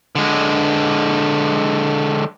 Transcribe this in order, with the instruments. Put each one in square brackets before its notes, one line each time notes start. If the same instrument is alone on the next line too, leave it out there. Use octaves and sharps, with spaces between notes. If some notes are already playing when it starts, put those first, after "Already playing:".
[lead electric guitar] D3 G#3